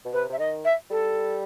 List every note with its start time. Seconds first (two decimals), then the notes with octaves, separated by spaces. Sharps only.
0.05 B2
0.13 C3 B4
0.29 C3 E5
0.39 D#3 D#5
0.65 E5
0.91 G3 A4